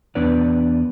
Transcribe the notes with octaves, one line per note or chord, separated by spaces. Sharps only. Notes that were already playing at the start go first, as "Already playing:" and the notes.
E2 B3 D4 B4 D5